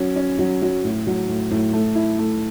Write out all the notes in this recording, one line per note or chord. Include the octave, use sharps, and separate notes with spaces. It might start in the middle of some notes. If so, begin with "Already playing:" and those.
Already playing: F#3 C#4
C#4
F#3
F#3
A2
F#3
A2
A2
A3
E4
A3